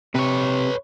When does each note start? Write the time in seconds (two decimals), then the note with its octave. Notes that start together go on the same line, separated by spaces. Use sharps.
0.15 C3 B4 C#5